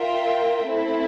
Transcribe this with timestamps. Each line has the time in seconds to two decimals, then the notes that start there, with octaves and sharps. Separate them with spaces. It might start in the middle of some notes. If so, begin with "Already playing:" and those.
Already playing: F4 A#4 E5 G5
0.69 A3 C4 E4 A4